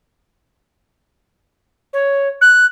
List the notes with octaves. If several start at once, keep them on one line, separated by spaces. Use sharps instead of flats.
C#5
F#6